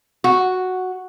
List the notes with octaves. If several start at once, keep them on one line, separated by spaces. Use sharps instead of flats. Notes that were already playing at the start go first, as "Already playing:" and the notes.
F#4